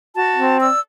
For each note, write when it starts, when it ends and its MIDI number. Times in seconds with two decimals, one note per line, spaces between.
0.15 0.56 66
0.15 0.56 81
0.36 0.69 60
0.60 0.79 74
0.60 0.79 88